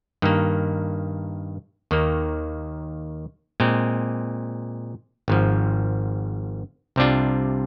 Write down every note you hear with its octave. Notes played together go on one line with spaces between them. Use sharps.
G2 D#3 A#3
D#2 D#3 A#3
A#2 G#3 C4
G#1 G#2 F3
C2 C3 G3 D4 F4